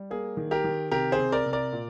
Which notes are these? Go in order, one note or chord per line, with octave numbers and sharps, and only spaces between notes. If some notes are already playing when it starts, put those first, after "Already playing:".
Already playing: G3
A#3 G#4
D#3
G4 A#4
D#3
C3 G4 A#4
G#4 C5
C3
A#4 D5
C3
A#4 D5
A#2